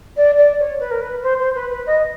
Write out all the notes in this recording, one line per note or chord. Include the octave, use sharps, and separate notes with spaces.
D5
D5
C#5
B4
A#4
B4
C5
C5
B4
B4
D#5